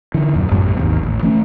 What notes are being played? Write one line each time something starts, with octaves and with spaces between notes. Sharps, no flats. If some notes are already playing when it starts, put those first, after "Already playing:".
D3 E3
D#1 F#2
A1 F#2 B2 G3
G#1 D#2
A1
E3 A3 C#4